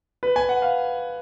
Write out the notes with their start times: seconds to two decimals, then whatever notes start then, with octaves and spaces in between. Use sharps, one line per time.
0.23 B4
0.36 G#5
0.49 F#5
0.62 F5